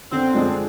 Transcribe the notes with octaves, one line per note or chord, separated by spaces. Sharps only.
D3 C4
F3 G#3 D4 G#4